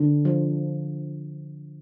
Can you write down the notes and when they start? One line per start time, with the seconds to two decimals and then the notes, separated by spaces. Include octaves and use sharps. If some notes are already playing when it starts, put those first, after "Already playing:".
Already playing: D3
0.25 F3